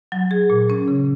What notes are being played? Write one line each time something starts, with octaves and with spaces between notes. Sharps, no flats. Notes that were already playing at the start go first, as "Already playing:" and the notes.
F#3
G#4
A#2
C#4
C#3